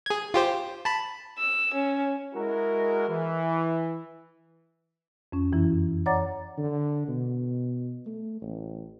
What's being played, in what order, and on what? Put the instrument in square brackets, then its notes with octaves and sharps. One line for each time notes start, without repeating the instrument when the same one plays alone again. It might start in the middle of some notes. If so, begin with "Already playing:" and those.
[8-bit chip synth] G#4 G#6
F4 G4 C5
A5 B5
[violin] E6
C#4
[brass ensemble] G#3 E4 F#4 A#4
E3
[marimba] F2 C#4
F#2 E3 E4
C#5 D5 F#5 A#5 D6 A6
[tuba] D3
B2
A3
A1